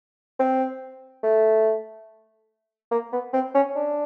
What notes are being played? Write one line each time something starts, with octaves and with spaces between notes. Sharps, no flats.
C4
A3
A#3
B3
C4
C#4
D4